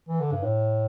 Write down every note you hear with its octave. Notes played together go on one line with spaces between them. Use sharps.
E3
D3
G2
A2